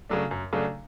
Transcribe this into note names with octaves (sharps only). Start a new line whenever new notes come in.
C#3 F#3 A3 D4
F#2
C#3 F#3 A3 D4